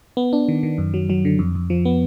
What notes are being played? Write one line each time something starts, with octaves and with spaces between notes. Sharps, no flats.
B3
D4
D#3
D#3
F#2
F#3
F#3
D3
F2
F2
F3
B3